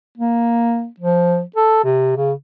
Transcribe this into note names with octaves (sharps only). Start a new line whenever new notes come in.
A#3
F3
A4
C3
C#3